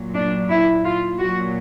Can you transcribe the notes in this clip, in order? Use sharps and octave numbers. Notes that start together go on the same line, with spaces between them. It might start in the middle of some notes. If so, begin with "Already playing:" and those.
Already playing: A#2 F#3
D4
E4
F4
A#2 F#3 F#4